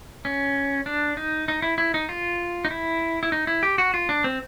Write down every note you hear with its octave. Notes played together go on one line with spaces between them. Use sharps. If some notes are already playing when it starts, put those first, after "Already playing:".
C#4
D4
D#4
D#4
E4
E4
D#4
F4
D#4
E4
E4
D#4
E4
G4
F#4
F4
D4
C4